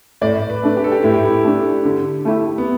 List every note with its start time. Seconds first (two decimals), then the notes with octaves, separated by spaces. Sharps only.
0.21 A2 D5
0.50 B4
0.63 A3 D4
0.77 G4
0.84 A4
0.92 G4
1.03 A2 E4
1.14 G4
1.25 E4
1.44 A3 D4
1.85 D3
2.25 A3 E4 G4
2.58 B3